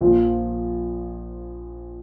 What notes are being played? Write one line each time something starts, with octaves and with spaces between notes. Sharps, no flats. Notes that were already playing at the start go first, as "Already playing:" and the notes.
A#1 A#2 F3